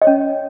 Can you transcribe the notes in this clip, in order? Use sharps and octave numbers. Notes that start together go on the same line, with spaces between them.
C#4 C#5 D#5